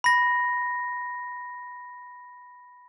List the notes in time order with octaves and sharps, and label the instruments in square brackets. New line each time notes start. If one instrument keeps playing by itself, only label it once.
[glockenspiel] B5 A#6